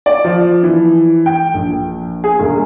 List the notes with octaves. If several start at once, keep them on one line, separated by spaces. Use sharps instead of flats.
D5
F3
E3
G5
A#1
G#4
E1